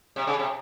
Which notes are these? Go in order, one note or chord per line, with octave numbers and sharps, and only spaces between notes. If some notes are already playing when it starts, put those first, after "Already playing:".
C3
C#3
C3